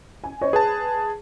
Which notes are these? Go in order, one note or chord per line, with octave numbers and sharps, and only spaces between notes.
G#5
C5 C#5 D#5
G#4 B4 A5